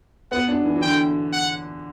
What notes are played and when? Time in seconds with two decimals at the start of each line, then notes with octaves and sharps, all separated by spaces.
0.32 B3 F#5
0.48 D4
0.65 E3
0.76 E3
0.82 D3 G5
1.33 F#5